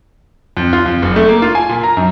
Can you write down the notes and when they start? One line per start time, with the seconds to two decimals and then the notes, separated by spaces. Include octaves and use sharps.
0.57 F2
0.73 F4
0.86 F2
1.02 F#1
1.16 A3
1.29 A#3
1.42 F4
1.55 G#5
1.69 A#2
1.84 A#5
1.97 F#2